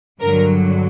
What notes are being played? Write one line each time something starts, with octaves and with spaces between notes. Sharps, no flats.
G2 D3 F#3 A#4